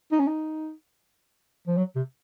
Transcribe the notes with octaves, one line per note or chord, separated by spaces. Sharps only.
D#4
C#4
D#4
F3
F#3
C3